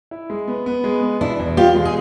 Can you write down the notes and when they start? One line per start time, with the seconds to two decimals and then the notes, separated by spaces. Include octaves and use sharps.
0.11 E4
0.30 G#3
0.48 B3
0.66 B3
0.84 G#3
1.02 B3
1.21 B2 D4 E4
1.39 E2
1.57 B2 F4 G4
1.75 G#3
1.85 G#4